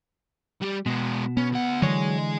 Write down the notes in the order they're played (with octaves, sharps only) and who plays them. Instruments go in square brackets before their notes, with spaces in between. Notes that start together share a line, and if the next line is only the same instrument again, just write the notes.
[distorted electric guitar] G3 G4
[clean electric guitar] B2 [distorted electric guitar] G#3 B3
[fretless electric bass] B3 [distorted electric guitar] C#4
[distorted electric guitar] D2 F#5
[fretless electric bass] D3 E3 G#3 [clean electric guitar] F#3 C#5 [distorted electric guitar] D#5 G#5